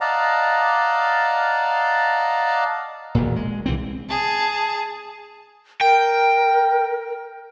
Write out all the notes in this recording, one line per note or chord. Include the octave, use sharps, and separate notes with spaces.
D5 D#5 F5 F#5 A5 A#5
E1 A#2
G#3
C2 E3 C4
G#4 A5
A#4 G5